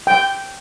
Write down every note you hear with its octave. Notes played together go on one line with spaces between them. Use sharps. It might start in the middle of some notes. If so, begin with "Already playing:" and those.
G5